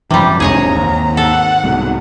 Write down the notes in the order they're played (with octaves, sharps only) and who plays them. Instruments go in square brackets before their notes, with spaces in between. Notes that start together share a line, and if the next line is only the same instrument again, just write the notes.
[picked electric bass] G#1 F#2 F3 [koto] C3 G3 [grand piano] E3
[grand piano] E1 [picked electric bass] G#2 C3 [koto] G#4 C#5 D#5 [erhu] A#5
[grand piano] G#1 [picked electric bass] D#2
[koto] A4 [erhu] F#5
[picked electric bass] C2 G#2 B2